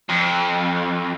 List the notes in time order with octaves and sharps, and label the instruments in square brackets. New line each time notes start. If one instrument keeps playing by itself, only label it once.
[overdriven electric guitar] F2